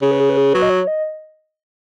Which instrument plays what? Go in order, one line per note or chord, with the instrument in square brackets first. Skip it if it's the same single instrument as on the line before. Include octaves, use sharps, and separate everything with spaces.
[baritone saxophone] C#3 [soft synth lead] G#4
[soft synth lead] B4
G#4
B4
G#4
[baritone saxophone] F#3 [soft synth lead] B4
[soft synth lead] D#5
C#5
D#5